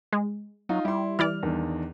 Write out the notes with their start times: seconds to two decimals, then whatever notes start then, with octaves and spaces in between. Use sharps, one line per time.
0.13 G#3
0.69 F#3 D#4 F4
0.85 G3 E4 C6
1.19 E3 E4 D5 F6
1.43 E2 D#3 D4